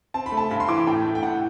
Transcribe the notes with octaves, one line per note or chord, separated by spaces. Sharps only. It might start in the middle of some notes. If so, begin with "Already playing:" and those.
C4 A5
B5
A3
A5
G2 B5
C6
E3 D6
B5
A2 G5
A3
G5
A2 F#5